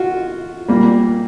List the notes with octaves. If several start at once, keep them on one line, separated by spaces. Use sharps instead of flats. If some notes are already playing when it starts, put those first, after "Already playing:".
Already playing: F4 F#4
A#2 G3 A#3